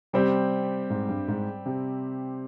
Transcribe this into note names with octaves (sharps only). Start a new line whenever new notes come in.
C3 G3 C4 G4
G#2
G2
G#2
C3